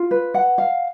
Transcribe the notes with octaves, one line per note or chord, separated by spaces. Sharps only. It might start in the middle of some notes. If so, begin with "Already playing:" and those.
Already playing: F4
B4
F#5
F5